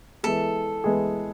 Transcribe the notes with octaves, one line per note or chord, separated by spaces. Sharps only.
E3 G#3 B3 E4 G#4 A4
E3 G#3 B3 E4 G#4